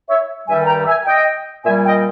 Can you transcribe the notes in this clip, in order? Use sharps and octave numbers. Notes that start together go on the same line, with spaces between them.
C#5 E5
G2 D#3 G3 E5 G#5
G#5
G5 A#5
E5 G#5
D#5 G5
A#2 G3 E5 G#5
D#5 G5